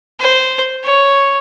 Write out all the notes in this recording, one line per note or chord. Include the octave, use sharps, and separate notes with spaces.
C5
C#5